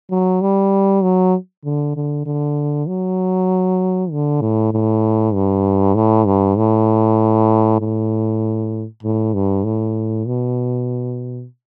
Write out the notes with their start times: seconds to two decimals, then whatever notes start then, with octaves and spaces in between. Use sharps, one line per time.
0.11 F#3
0.41 G3
1.03 F#3
1.65 D3
1.96 D3
2.26 D3
2.88 F#3
4.11 D3
4.41 A2
4.73 A2
5.34 G2
5.95 A2
6.26 G2
6.57 A2
7.81 A2
9.03 A2
9.34 G2
9.64 A2
10.26 B2